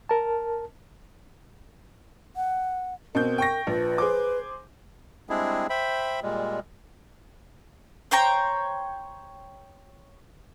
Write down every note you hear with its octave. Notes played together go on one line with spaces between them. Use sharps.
A#4 A5
F#5
B2 C4 A#4 G6
G5 C#6 A#6
A#1 F3 B4
G#4 C5 D6
G3 G#3 C4 D4 E4 G#4
C5 E5 G5 B5
A#2 G3 G#3
C5 C#5 G5 A#5